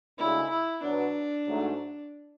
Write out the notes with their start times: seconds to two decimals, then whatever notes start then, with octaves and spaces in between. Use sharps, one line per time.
0.17 D2 C#3 G#3 E4
0.50 E4
0.83 B2 F#3 B3 D4
1.47 G#2 F#3 A3